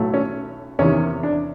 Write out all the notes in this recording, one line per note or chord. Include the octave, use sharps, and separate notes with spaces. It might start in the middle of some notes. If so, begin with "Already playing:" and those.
Already playing: B1 A2 F#3 A3
C#4
E2 C3 D#3 C#4
D4